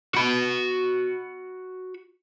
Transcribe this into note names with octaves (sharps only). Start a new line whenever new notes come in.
F#4 B5